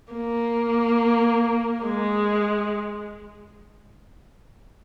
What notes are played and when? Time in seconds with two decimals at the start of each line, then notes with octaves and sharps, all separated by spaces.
0.13 A#3
1.85 G#3